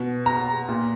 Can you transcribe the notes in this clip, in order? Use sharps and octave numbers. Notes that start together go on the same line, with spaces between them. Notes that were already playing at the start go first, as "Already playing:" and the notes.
Already playing: B2
A#5
A#2